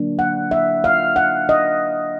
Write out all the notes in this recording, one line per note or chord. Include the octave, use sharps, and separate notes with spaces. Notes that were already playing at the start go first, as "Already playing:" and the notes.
Already playing: D3 F#3 A#3 D4
F#5
E5
F5
F#5
D#5